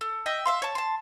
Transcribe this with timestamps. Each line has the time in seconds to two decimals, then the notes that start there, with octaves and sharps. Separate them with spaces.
0.01 A4
0.26 D#5 E5 G5
0.45 E5 F5 C6
0.62 C#5 A5
0.75 A5 C6